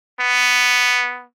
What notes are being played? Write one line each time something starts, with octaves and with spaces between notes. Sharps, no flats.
B3